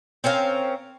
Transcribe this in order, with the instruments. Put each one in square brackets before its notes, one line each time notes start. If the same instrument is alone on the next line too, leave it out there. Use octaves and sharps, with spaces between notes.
[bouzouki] C4 C#4 A#4 F5